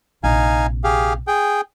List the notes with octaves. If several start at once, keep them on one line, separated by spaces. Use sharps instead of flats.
A#1 C3 D#4 F5 G#5
G4 G#4 F5
G#4 G5